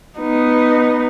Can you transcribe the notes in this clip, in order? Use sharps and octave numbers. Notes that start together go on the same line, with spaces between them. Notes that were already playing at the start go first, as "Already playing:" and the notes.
B3 D#4